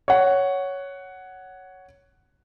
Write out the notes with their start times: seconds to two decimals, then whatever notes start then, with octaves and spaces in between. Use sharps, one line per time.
0.08 C#5 F#5